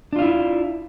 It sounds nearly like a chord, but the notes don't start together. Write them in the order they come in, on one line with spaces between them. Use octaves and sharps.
D4 F4 F5 E4